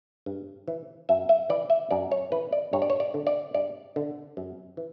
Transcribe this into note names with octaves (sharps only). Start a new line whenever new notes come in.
G2
E3
F#2 E5
E5
E3 D5
E5
F#2 D5
C#5
E3 B4
D5
G2 C#5
D5
C#5
D5
D3
D5
G2 D5
D3
F#2
E3